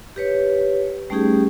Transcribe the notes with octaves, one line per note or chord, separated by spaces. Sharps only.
G4 B4 C#5
G3 A3 C#4 D#4 G4 G#4